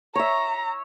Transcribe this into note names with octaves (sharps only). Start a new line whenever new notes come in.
C#5 E5 A#5